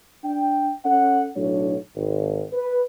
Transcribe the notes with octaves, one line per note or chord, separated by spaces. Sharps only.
D4 G5
C#4 A4 F#5
B1 A2 F#3 D4 C#5
G#1
B4